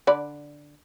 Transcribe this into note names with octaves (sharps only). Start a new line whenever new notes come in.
D3 D5 B5